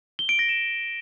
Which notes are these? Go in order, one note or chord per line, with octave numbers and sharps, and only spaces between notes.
G7
D7
A#6
E7